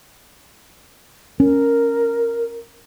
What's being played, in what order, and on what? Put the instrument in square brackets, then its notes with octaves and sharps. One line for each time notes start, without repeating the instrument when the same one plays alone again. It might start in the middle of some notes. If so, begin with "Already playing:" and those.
[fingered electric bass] C#4 [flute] A#4